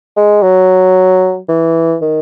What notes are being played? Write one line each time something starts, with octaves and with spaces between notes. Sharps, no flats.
G#3
F#3
E3
D#3